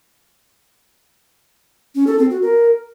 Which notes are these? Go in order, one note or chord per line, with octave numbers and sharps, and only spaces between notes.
C#4
A4
C4
F#4
A#4